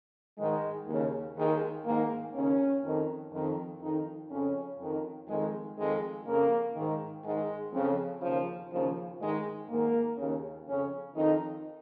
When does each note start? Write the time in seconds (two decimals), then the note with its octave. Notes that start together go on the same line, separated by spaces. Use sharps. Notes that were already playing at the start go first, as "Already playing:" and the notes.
0.38 G#2 D#3 G#3
0.87 D#2 C#3
1.36 D#2 D#3 G#3
1.85 G#2 D#3 A#3
2.34 D#2 C#3 C#4
2.83 F2 D#3
3.32 F2 D#3
3.81 F2 D#3 D#4
4.30 F2 C#3 C#4
4.79 F2 D#3
5.28 F2 D#3 G#3
5.77 F2 D#3 G#3
6.26 F2 C#3 A#3
6.75 G#2 D#3
7.24 G#2 D#3 G#3
7.73 F2 C#3
8.21 D#2 C#3 F3
8.70 D#2 C#3 F3
9.19 G#2 D#3 G#3
9.69 G#2 D#3 A#3
10.17 D#2 C#3
10.67 F2 C#3 C#4
11.15 F2 D#3 D#4